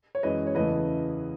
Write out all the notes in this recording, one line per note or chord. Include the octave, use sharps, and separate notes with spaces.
C#5
F#2 E3 G#3 B4 D#5
C#5
E2 C#3 E3 A3 B4 D#5